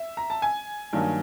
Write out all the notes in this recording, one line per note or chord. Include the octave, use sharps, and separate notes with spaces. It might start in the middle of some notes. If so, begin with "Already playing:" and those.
Already playing: E5
A#5
A5
G#5
G2 D#3 F#3 A#3